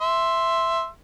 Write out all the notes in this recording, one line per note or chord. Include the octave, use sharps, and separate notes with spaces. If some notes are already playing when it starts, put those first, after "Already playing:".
E5 C6